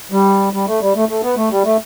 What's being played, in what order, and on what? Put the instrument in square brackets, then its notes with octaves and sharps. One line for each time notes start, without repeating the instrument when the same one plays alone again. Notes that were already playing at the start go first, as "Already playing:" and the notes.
[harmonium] G3
G3
A3
G3
A3
A3
B3
A3
G3
A3